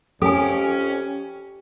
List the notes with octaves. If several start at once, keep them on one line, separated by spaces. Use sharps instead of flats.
F2 C#4 G4 A4 G#5